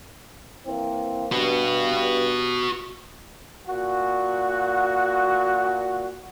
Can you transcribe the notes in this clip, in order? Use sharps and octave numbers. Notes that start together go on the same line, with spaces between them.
E3 A#3 C4
G2 F#4 B4
A#2 F#4